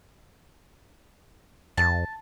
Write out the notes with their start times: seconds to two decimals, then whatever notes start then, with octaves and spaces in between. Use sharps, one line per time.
1.77 F2 A5